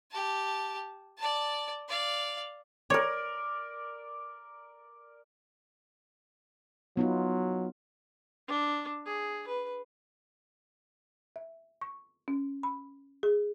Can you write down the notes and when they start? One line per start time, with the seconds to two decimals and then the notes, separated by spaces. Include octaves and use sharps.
0.11 G4 A5
1.18 D5 A5
1.88 D5 F5
2.90 A#4 C#5 D5
6.97 F#3 B3 D#4 F4
8.48 D4
9.06 G#4
9.47 B4
11.36 E5
11.82 C#6
12.28 C#4
12.63 B5
13.23 G#4